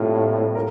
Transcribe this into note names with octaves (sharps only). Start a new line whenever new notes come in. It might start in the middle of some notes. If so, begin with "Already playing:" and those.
Already playing: A2 C3 G3 A#3 F4
A#4